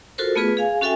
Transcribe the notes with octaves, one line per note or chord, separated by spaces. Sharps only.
F4 F#4 A4 A#4 C5
A3 B3 F4 G#4 B4
G#4 F5 G#5
C#4 F#4 A4 E5 G5 G#5